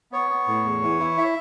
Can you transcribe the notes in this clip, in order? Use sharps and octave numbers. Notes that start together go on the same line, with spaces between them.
B3 C#5
B3
A2
E2
E3
E4
E5